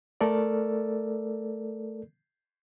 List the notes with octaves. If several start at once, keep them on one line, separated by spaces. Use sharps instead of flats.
A3 A4 A#4 D5